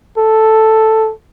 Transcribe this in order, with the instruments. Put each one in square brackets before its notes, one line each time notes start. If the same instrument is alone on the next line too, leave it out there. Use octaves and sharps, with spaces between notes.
[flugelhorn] A4